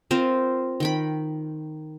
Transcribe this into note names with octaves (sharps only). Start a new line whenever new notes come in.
C4 F4 A#4 C5
D#3 G5 B5